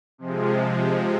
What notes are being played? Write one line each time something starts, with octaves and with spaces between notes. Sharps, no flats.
C3 F3 G#3